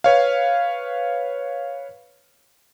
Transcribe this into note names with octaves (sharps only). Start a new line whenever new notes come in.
B4 C#5 F5